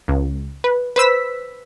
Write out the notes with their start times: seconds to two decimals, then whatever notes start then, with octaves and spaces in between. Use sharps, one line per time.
0.08 C#2
0.64 B4
0.96 B4 C5 E6 B6